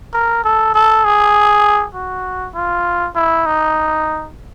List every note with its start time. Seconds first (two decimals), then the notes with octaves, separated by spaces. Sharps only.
0.14 A#4
0.44 A4
0.75 A4
1.05 G#4
1.95 F#4
2.55 F4
3.15 E4
3.46 D#4